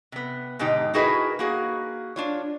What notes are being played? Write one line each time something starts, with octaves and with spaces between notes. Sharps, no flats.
C3 B3
G#2 B2 D3 D#4 G4
D#4 E4 F#4 G#4 A#4 B4
A#3 F#4 G#4
D4 F4 C#5